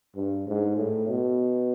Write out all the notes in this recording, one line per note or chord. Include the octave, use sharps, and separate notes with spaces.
G2
G#2
A2
B2